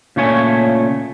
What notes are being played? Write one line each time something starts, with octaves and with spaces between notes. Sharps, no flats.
A#2 C#3 A3 C#5 G#5